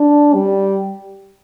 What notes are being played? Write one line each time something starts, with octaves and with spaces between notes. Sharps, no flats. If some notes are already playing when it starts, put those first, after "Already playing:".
Already playing: D4
G3